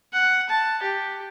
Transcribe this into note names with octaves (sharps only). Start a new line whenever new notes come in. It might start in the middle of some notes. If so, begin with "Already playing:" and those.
F#5
A5
G4